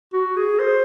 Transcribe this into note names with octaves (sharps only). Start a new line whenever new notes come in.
F#4
G#4
C5